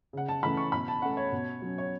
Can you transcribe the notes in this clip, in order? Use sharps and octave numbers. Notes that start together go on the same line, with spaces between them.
C#3 F#5
A5
E3 A3 C#4 B5
C#6
B2 B5
A5
A3 C#4 F#5
C#5
B2
F#3 C#4
C#5